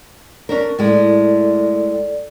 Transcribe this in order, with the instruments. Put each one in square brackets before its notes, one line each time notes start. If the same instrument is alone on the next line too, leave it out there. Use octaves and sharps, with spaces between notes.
[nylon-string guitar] C#4 D4 A#4
[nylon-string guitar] A2 G#3 [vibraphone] A4 D5